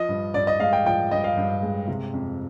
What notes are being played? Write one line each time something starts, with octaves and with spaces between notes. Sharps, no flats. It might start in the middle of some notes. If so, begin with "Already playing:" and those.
Already playing: F3 D#5
G2
G2 D5
D#5
G#3 F5
G5
F3 G5
G2 D#5
F5
G2
G#3
C3
F2